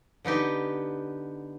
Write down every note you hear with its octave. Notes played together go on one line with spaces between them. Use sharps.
D3 B3 D#4 G4